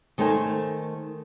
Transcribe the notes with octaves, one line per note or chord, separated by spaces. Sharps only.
D#3 A3 A#4 C5 G#5 A5